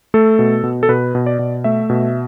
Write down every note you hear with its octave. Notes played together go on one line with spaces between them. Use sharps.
A3 A4
B2
B2
A4
B2 B4
B2
D5
B2
A3 E5
B2